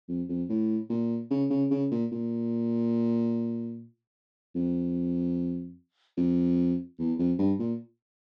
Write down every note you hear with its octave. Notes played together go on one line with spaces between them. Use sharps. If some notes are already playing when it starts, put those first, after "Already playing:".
F2
F2
A2
A#2
C#3
C#3
C#3
A#2
A#2
F2
F2
E2
F2
G2
A#2